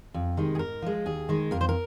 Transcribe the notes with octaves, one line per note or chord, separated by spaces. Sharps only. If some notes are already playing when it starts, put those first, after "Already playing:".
F2
C3 D#3 G#3
G#4
G#2 A#4
F3 G#3
D#2 G#4
D#3 G#3
F2 A#4
C5
A#4